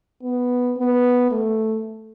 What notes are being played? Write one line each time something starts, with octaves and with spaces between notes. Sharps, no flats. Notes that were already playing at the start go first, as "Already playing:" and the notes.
B3
B3
A3